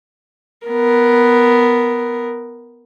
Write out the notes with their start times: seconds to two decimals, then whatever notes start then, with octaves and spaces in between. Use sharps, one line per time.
0.67 B3 A#4